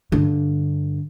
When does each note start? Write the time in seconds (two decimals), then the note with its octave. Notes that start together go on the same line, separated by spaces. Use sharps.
0.12 G2 D3